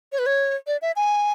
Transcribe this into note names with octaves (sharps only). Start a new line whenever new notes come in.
C#5
B4
C#5
D5
E5
G#5